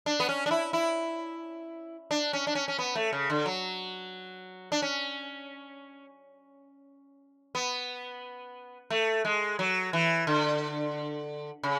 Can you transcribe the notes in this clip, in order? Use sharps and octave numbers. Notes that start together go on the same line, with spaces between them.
D4
B3
C#4
D4
E4
E4
D4
C#4
D4
C#4
C#4
B3
A3
C#3
D3
F#3
D4
C#4
B3
A3
G#3
F#3
E3
D3
C#3